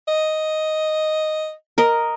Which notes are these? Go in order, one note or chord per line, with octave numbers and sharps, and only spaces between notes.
D#5
A#4 D#5